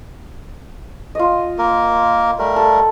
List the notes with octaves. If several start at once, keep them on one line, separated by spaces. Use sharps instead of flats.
F4 D#5
A#3 A#4
G3 A3 A#4
A4